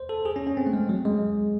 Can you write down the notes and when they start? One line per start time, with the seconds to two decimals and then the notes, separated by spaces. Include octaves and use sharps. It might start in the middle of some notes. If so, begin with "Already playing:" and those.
Already playing: C5
0.09 A4
0.25 G#4
0.36 C#4
0.47 C#4
0.57 C4
0.67 A3
0.73 G#3
0.89 F#3
1.05 G#3